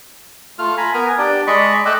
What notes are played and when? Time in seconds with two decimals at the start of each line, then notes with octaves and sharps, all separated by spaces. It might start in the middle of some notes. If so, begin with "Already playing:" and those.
0.59 A3 F4 F6
0.78 G#5 A#5 B5
0.94 B3 A#4 G#5
1.18 D4 G4 D5
1.47 G#3 D5 D#5 B5 C#6
1.86 A3 D#5 G5 D6 E6 F#6